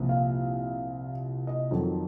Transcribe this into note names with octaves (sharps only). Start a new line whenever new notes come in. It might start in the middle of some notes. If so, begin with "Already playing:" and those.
Already playing: C2 A#2 F3
F5
D#5
F2 D#3 F#3